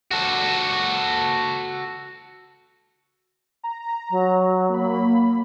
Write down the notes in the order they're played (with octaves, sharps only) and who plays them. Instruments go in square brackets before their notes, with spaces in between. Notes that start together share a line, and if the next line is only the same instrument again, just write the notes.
[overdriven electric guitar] F#4 A4
[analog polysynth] A#5
[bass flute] F#3
[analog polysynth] A#3 B5